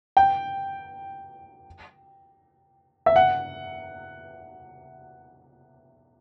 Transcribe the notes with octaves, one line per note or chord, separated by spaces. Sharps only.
G5
E5
F#5